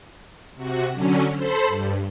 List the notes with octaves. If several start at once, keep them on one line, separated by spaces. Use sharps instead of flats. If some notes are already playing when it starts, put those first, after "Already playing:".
C3 F#4
D3 F#3 C#4
A4 C5 B5 C6
G2